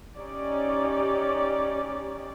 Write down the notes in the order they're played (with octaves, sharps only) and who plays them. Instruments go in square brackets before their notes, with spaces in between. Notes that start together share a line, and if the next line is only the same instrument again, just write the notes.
[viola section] C#4 D#4 G4 D5